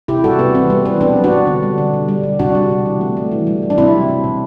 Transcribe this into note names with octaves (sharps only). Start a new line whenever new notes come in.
C3 E4 G4
G3 F#4 A4
C3 B3
E3 C4
G3 B3
E3 C4
B2 B3 D4
F#3
D4 F#4
B2
D3
G3
D3
B2
G3
B2
C3 D4 F#4
G3
C3
E3
A3
A3
E3
G3
E3
D4
C3 C4 E4
F#3
C3
B2